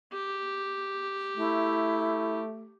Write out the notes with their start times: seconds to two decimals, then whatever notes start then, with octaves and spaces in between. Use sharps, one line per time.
0.13 G4
1.38 A3 E4